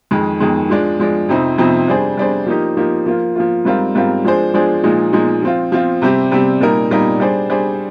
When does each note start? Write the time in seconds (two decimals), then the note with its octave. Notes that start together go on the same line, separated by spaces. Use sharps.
0.11 F2 D#3 G#3
0.40 F2 D#3 G#3
0.69 F3 G#3 D4
1.00 F3 G#3 D4
1.29 F2 C3 F3 C4 D#4
1.58 F2 C3 F3 C4 D#4
1.88 G3 D4 G#4 C5
2.17 G3 D4 G#4 C5
2.47 F3 A#3 D#4 G4
2.77 F3 A#3 D#4 G4
3.06 F3 A#3 F4
3.36 F3 A#3 F4
3.65 G#2 G3 C4 F4 A#4
3.95 G#2 G3 C4 F4 A#4
4.24 F3 G#3 D4 G#4 C5
4.54 F3 G#3 D4 G#4 C5
4.83 A#2 F3 G#3 D#4
5.13 A#2 F3 G#3 D#4
5.42 F3 C4 F4
5.72 F3 C4 F4
6.02 C3 G3 C4 G4
6.31 C3 G3 C4 G4
6.60 A#2 G3 A#3 D#4 A#4
6.90 A#2 G3 A#3 D#4 A#4
7.20 G3 D4 G#4 C5
7.50 G3 D4 G#4 C5